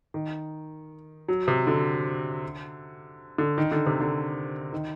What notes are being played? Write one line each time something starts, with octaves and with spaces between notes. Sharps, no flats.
D#3
F#3
C3
D3
D3
D#3
D3
C3
D3
D#3